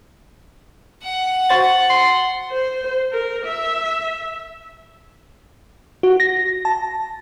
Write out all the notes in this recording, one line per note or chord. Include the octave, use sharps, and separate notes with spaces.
F#5
F#4 C5 A6
C6
C5
A#4
E5
F#4
A#6
A5